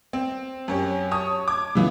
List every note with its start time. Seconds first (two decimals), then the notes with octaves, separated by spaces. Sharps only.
0.13 C4
0.68 F#2 C#4 G4
1.11 C#5 A5 D#6
1.48 D6 G#6
1.75 C#3 E3 B3